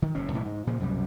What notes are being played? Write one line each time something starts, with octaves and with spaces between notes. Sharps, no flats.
D#3
F#1 A2 C#4
B1 A2 E3
G#2
A#2 C#3 F3
C2 F#2 B2 G3